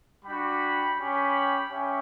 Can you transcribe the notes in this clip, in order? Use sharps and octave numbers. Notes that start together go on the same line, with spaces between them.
G3 D4 F#4 G5 B5
C#4 G4 G5 B5
C#4 G4 E5 G5